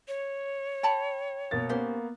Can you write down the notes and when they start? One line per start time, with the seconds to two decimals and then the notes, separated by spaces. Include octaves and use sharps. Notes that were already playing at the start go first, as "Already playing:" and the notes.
0.08 C#5
0.83 G5 A5 B5
1.51 B2 A#3 A6
1.69 A#3 B3 C#4 G4 C5